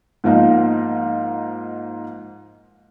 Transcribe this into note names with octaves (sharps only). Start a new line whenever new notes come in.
G#2 F3 A#3 D#4